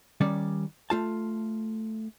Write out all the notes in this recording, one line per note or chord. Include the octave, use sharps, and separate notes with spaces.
D#3 G3 C#4 D5
A3 F4 A5